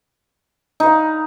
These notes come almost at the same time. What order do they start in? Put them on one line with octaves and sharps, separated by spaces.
D#4 B4 F5